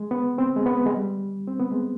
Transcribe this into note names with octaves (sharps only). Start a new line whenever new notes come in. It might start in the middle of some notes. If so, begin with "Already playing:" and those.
Already playing: G#3
B3
C4
G#3
B3
G#3
G3
C4
B3
G#3